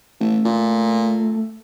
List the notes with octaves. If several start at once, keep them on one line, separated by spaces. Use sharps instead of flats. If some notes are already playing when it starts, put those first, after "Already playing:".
A1 A3
A#2